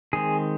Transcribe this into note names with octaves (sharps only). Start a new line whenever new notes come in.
D#3 G#3 C4 G#4